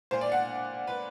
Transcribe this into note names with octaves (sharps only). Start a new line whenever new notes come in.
A#2 C5
D5
F#5
B4